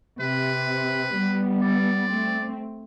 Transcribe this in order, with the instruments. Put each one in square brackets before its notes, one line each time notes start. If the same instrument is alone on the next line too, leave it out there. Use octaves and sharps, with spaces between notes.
[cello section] C3 [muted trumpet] B4
[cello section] G3 B3
[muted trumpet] D5
[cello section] A3 C4